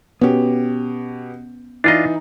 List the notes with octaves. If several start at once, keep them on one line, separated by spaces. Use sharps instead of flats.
B2 B3 C#4 G4
E3 D4 D#4 F4 D#5